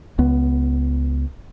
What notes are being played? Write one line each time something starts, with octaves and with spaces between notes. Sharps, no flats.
C#2 B3